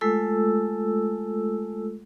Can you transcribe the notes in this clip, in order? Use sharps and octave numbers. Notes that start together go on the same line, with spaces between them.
G#3 A3 F4 A4 E6